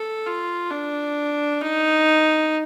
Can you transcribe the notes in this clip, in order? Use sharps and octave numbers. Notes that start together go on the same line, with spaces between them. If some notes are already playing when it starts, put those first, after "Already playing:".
Already playing: A4
F4
D4
D#4